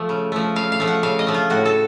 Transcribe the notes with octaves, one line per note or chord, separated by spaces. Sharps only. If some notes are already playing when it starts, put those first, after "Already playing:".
Already playing: F3 A3
C#3
F3 A3
C#3 F5
F5
F3 A3
F#5
C#3 F5
D#5
F3 A3
F4
A2 F#4
A4